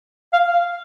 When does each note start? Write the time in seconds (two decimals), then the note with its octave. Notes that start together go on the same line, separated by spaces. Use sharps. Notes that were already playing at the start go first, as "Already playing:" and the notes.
0.33 F5